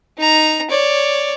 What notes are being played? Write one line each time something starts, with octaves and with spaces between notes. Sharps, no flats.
D#4 A#5
C#5 D5